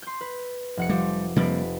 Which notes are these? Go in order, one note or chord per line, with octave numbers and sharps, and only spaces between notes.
C6 G6
B4
F1 F#5 C#7
F3 G3 D6
F1 C3 G3 A#3 B4 D7